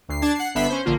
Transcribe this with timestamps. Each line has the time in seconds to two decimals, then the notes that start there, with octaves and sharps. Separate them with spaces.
0.09 D2 C7
0.22 D4 A5 G#6
0.35 F#5 C7
0.55 G1 D3 B3 E5 B5 C7
0.70 C#4 C5
0.85 A#1 D3 A#3 F4